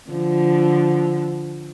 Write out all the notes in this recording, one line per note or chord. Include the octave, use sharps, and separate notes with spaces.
D3 F3